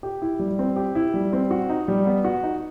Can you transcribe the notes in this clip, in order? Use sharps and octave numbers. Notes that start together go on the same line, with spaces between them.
G4
E4
G3
C4
G4
E4
G3
C4
F#4
D#4
G3
B3
F#4
D#4